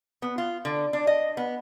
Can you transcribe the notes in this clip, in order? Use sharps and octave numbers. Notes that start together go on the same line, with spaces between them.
B3
F4
D3
D4
D#5
B3